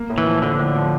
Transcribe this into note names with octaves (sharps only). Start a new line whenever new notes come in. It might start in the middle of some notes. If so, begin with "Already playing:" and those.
Already playing: A#3
A2
E3
F3
D3 F3
A2
F3